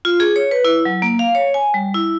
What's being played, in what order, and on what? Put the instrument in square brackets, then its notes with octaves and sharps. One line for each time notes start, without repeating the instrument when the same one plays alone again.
[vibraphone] F4
G#4
C#5
B4
E4
F#3
A#3
F5
C#5
G#5
G3
E4